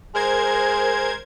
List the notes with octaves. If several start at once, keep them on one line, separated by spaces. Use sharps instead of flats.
G#3 A#4 C5 G#6